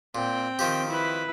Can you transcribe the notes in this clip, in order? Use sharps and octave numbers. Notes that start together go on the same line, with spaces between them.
A#2 C4 G5
D#3 F3 G4
E4 B4